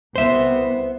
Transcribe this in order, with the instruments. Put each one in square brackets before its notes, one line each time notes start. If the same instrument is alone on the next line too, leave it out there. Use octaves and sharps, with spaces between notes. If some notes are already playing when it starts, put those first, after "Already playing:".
[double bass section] C2 B3 [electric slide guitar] C5 E5